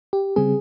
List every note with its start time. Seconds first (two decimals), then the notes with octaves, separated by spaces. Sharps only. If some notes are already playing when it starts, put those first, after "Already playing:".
0.13 G4
0.36 C#3 G3 C4 G#4